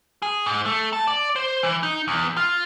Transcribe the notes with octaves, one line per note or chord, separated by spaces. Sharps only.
G#4
G#2
A3
A5
D5
C5
E3
D#4
E2
F4